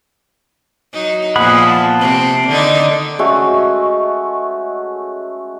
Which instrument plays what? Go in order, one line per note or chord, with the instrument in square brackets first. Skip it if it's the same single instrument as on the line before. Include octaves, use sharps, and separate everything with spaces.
[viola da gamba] F#3 D#4
[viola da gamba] A#2 F3 B3 [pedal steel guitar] G#4 F#5 B5
[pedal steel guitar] A5
[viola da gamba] C3 C4
D3 D#3 D#4
[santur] G#3 A3 C#4 F#4